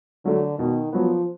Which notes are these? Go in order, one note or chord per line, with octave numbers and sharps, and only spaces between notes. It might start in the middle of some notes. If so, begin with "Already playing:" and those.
D3 F#3 A3
B2 D#3
F3 F#3 B3